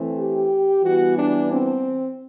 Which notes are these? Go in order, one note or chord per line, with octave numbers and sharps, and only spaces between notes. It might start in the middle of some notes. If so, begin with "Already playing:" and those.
Already playing: E3 A3 C4
G4
E3 G3 B3 F#4
D4
C4